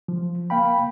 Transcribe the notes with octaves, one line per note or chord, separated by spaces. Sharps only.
F3
A#3 F5 G5 B5